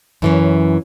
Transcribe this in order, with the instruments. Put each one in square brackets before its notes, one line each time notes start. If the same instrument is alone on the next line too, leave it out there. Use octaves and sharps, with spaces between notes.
[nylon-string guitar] F#2 E3 C#4